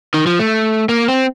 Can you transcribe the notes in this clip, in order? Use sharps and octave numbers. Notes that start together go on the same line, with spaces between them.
D#3
F3
A3
A#3
C4